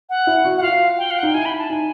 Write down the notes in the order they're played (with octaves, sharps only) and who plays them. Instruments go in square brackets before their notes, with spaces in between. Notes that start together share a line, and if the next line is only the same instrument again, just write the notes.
[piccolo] F#5
[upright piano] E4
F#4
[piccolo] F#5
[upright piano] F4 [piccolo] F5
[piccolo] G5
F5
F#5
[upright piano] D#4 [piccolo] G5
[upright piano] E4 [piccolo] G#5
[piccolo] B5
A5
[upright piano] D#4 [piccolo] G#5